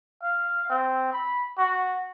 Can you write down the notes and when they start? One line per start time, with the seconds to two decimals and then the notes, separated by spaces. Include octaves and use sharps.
0.23 F5
0.70 C4
1.13 B5
1.58 F#4